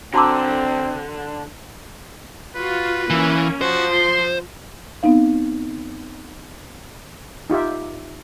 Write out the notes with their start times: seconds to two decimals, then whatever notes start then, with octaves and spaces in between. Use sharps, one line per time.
0.14 D3 C4 F#4 A5 A#5 C6 D6 E6
2.55 F4 F#4 B4
3.10 E3 A#3 C#4
3.61 F3 F#4 C5
3.91 C6
5.03 B3 C4 D#4 F5
7.50 D#4 F4 G4 E5